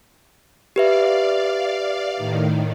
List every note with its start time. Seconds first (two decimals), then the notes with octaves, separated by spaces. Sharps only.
0.76 G4 B4 D5 E5 F5
2.17 A2 D#3